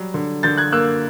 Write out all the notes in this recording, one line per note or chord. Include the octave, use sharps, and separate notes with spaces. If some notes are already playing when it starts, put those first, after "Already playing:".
Already playing: F#3 G3
D3
D3 G6 A6
F#6 G#6
A#3 E6 F#6